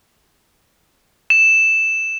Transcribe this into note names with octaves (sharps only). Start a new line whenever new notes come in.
E7